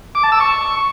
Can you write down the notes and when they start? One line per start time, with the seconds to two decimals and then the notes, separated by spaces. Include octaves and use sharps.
0.15 D6
0.23 A5
0.32 E6
0.40 C#6